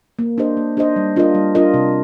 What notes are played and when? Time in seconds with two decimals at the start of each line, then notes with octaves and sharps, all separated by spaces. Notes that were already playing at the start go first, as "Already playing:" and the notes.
0.19 A#3
0.38 D4 G4 C5 D#5
0.57 A#3
0.77 D4 G4 C5 D#5
0.96 G3
1.16 D4 F4 A#4 D#5
1.35 G3
1.55 D4 F4 A#4 D#5
1.74 C3